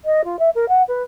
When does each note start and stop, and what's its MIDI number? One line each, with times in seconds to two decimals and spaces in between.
0.05 0.24 75
0.24 0.39 65
0.39 0.50 76
0.55 0.65 70
0.69 0.82 78
0.88 1.03 71